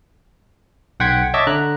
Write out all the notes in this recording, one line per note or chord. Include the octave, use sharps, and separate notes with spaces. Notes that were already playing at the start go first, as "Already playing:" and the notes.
B1 F#5 G5 C6 G#6 B6
C#5 D#5 E5 A5 D6 E6
D3 A#5 F#6